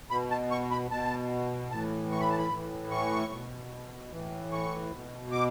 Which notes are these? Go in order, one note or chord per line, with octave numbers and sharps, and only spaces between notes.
B2 B5
A5
C#6
B5
B2 A5
A2 E3 A5
C#6
B5
A5
B5
A2 E3
C#6
B2
A2 E3
C#6
B2
D6